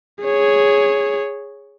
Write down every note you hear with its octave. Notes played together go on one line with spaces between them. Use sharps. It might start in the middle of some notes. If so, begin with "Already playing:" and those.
G#4 C#5